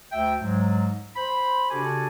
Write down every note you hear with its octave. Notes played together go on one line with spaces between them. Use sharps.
D2 E5 G5
G#2 F#3 G#3
C5 B5
C#3 D4 F#4 G4 A4 G#5